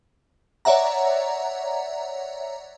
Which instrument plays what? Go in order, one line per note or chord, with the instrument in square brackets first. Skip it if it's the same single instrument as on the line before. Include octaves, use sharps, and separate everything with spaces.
[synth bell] C#5 D5 E5 F#5 A#5